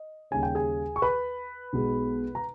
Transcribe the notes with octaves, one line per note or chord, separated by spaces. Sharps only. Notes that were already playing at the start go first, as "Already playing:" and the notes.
Already playing: D#5
D#2 C#3 G3 C#4 G#5
G5
G#4 G#5
C#6
B4 B5
B1 B2 G#3
A#5